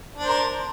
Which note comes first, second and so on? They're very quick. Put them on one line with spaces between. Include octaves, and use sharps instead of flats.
D4 C5 A#4